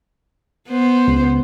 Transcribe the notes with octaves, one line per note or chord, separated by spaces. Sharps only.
B3 C5
C#2